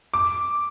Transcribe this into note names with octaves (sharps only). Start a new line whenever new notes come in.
D6